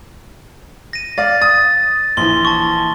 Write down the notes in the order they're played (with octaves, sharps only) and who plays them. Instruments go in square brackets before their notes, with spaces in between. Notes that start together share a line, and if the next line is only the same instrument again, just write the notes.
[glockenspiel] A#6 D#7
[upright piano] D5 F5 [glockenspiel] A6
[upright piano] D#6 [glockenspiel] A6
[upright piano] A#1 E3 [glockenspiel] C6 G7
[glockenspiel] A5 C#6